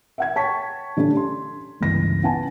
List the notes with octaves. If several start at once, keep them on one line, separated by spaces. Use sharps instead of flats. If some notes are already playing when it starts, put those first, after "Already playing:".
E5 F#5 G#6
C#5 G5 A5 C#6 B6
D3 G3 A3 C#4 D4
C6
G1 C#2 E3 A#6
B3 C#4 F#5 G#5 A5